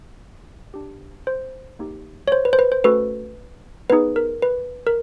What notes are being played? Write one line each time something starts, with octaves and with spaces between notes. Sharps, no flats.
D4 G4
C5
A#3 D#4 G4
C#5
C5
B4
C5
B4
C5
A3 C#4 F#4 A4 B4
B3 D#4 G#4 B4
A#4
B4
A#4